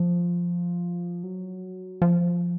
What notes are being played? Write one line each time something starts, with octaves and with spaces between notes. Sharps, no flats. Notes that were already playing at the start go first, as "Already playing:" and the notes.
Already playing: F3
F#3
F3